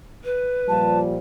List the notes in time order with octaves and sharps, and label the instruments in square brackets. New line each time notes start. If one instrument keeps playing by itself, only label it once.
[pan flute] B4
[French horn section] A#2 F3 G3 [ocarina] A5